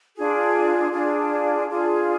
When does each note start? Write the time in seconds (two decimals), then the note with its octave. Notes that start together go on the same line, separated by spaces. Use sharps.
0.16 D4 F4 G#4
0.92 D4 F4 G#4
1.68 D4 F4 G#4